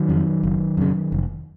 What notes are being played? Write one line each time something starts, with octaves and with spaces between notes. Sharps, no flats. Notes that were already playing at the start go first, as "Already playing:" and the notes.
Already playing: D#3 F#3
F2 C#3
F#1
F#2 C#3
F1